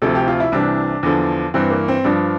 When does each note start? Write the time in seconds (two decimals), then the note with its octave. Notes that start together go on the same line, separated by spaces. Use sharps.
0.02 D2 C3 F3 A4
0.15 G4
0.28 F4
0.40 E4
0.52 C2 C3 E3 D4
1.03 E2 D3 F3
1.54 G2 E3 C4
1.70 A#3
1.88 C4
2.04 G2 F3 D4